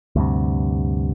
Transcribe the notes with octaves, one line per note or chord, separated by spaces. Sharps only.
D2 G2 C3